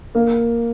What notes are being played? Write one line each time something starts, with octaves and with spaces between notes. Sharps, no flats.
A#3